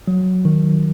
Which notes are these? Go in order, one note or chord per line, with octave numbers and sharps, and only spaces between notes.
F#3
D#3